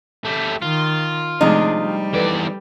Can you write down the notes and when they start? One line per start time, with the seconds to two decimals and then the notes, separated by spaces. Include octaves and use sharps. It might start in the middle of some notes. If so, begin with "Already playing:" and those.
0.25 A3 G4
0.62 D#3 F4
1.41 C3 F3 G#3 A3 D4 D#4 G#4
1.76 G3
2.13 E2 A4 B4 D5